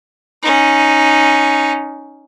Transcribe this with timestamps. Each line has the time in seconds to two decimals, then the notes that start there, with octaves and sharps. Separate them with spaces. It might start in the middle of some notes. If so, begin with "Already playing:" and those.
0.42 C#4 D#4